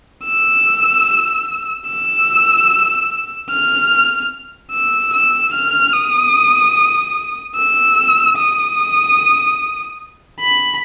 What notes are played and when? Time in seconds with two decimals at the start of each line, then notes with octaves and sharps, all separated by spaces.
0.24 E6
1.87 E6
3.50 F6
4.72 E6
5.13 E6
5.53 F6
5.93 D#6
7.56 E6
8.37 D#6
10.40 B5